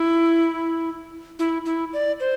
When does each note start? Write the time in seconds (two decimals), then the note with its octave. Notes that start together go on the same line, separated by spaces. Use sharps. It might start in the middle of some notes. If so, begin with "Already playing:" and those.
Already playing: E4
1.39 E4
1.65 E4
1.93 D5
2.20 C5